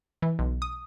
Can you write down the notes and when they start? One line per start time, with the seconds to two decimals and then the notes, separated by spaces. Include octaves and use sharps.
0.22 E3
0.39 B1
0.62 D#6